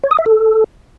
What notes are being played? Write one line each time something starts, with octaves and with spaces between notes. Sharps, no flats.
C#5
D#6
E5
A4